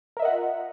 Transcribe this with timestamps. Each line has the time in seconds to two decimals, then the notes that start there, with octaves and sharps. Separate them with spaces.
0.17 A#4
0.19 E5
0.22 D#5
0.25 F#5
0.28 F4